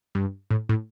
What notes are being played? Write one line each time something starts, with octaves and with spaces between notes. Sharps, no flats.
G2
A2
A2